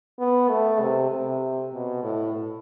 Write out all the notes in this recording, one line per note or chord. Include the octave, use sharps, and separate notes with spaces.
B3
A3
C3
C3
B2
A2